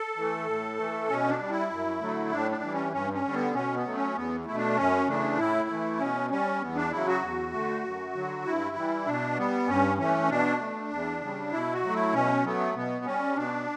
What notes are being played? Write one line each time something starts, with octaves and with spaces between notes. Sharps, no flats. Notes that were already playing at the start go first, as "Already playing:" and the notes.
Already playing: A4
E3 A3
A2
E3 A3
B2 C#4
D4
G3
E4
F#2
D3 F#3 A3
A2 D4
D4
E3 G3
C#4
G2 C#4
C#4
D3 G3
B3
B2 C#4
B3
F#3 A3
C#4
E2 B3
B2 A3 E4
D4
F#2 C#4
C#3 E3 A3 D4
A2 E4
E3 A3
B2 C#4
G3 C#4
E2 B3
D4
C#3 F#3 E4
F#4
E2
D3 A3
F#2
D3 F#3
G2 E4
E3 G3
B2 D4
G3 B3
G2 C#4
E3 A3 C#4
B2 D4
A3
E2
C#3 G3
B2 E4
F#4
F#3 A3
E4
B2 C#4
F#3 A3 B3
B2 B3
G3 C#4
B2 D4